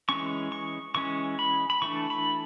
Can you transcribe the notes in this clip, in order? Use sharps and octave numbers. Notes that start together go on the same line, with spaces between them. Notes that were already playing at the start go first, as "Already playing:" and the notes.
E3 G#3 C#4 C#6
C#6
E3 G#3 C#4 C#6
B5
B5
E3 A3 D4 C#6
B5